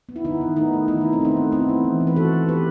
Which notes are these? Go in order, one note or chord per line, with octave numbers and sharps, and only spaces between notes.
B3
E4
D#3 B3 D#4
D#3
A3 B3 D#4
A3
D#3 E4
D#3 D#4
C4
A3 B3 D#4
A3
B3 C4 E4
B3
E3
E3
B4
E3 F#4 A4
B3
B3 G4 B4